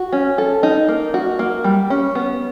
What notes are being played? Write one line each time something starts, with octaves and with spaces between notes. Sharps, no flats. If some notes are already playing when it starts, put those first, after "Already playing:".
Already playing: F#4
C#4
A4
D#4
A#3
F#4
A#3
G3
C#4
B3